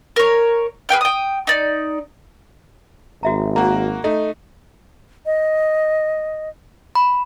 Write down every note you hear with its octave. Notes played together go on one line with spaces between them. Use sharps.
A#4 C#5
G#4 B4 G5 F6
G5 D#6
D#4 D5
G#1 F#4 E5 A#5
A#3 F#4 A#5
A3 D#4
D#5
B5